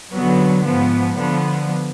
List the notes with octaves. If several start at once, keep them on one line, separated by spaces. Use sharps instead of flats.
D3 F#3 B3
G#2 F3 B3
D3 F3 B3